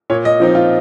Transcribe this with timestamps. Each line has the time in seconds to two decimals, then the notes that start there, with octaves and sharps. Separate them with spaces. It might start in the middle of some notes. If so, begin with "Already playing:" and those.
0.10 A#2 C#5
0.25 D#5
0.40 F3 C4 D#4
0.55 F4